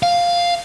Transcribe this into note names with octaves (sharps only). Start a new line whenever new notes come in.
F5